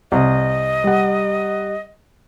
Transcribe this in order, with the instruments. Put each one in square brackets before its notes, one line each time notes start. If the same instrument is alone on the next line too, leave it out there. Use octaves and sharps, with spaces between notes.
[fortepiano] C2 [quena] D#5
[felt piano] G3 F#5